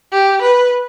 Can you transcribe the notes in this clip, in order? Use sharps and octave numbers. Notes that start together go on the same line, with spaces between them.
G4
B4